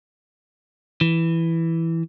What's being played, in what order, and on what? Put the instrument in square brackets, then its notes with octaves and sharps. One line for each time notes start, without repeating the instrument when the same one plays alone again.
[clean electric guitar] E3